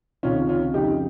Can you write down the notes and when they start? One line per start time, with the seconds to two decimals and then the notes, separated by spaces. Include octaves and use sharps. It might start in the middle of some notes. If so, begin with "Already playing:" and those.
0.23 C#2 C3 D#3 C#4 F4
0.49 C#4 F4
0.74 F2 C#3 F3 D#4 G4